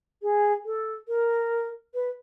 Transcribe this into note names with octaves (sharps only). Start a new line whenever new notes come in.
G#4
A4
A#4
B4